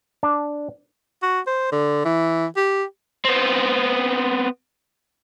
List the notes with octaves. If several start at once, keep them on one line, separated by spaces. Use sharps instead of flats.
D4
F#4
C5
D3
E3
G4
B3 C4